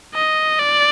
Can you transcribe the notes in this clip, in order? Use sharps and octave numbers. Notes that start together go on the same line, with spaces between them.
D#5
D5